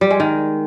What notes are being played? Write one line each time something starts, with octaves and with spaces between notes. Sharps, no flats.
G3
G#3
D#3